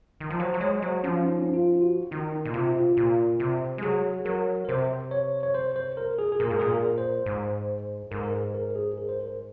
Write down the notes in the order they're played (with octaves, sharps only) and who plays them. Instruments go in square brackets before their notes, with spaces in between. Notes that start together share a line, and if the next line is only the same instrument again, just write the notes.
[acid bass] D#3
F3
[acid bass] F#3 [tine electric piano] C5
[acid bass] F#3
[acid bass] G#3 [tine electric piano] C#5
[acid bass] F#3 [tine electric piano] C5
[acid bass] F3 [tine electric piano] C#4
[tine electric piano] D#4
C#4
D#4
F4
F4
F#4
[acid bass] D#3 [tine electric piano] D#4
[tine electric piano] D#4
[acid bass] A#2
[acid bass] C3 [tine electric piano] F4
[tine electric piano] F4
[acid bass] A#2
C3
G#3
[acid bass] F#3 [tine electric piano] G#4
[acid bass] F#3 [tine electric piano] A#4
[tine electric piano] A#4
[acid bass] C3 [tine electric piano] C5
[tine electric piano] C#5
C#5
C5
C5
A#4
G#4
G#4
[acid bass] A#2 [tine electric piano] A#4
[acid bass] G#2
[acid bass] A#2 [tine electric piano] G#4
[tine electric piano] A#4
C5
[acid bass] G#2
[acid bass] G#2 [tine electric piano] A#4
[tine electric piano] A#4
G#4
A#4
G#4
A#4
C5
A#4